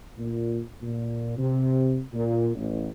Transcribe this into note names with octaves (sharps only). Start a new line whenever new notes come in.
A#2
A#2
C3
A#2
A1